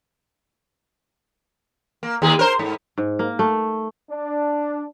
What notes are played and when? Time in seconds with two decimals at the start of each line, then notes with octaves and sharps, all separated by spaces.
2.03 A#3
2.22 D#2 A#3 G#4
2.39 A#4 C5
2.59 G#2
2.98 G#2
3.19 A#3
3.39 A3
4.10 D4